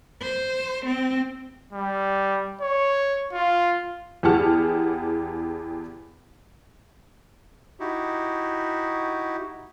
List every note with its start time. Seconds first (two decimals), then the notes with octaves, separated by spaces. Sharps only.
0.22 C5
0.86 C4
1.73 G3
2.61 C#5
3.33 F4
4.23 E2 G4 G#4 F#5 A5 F6
7.80 D#4 E4 F#4 G4